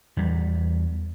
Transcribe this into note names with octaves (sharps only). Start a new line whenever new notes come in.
E2 G3